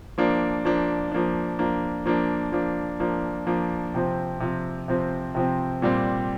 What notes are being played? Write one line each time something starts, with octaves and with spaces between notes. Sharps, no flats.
F3 A#3 D4
F3 A#3 D4
F3 A#3 D4
F3 A#3 D4
F3 A#3 D4
F3 A#3 D4
F3 A#3 D4
F3 A#3 D4
C3 F3 C4
C3 F3 C4
C3 F3 C4
C3 F3 C4
A#2 G3 C4